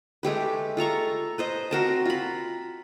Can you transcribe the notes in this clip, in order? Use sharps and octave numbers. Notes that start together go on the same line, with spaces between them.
G#3 A3 G4 B4
F4 A4 A#5 C#6
B4 C5 D#5
C4 F#4 A#4 A5
F4 B5